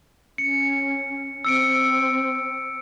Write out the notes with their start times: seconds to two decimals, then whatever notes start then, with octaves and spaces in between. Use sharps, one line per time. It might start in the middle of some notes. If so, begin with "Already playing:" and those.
0.38 C#4 C#7
1.45 C4 E6 C#7 D7